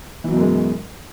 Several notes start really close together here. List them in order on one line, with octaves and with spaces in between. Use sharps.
E3 F#3 B2 F#2 G#3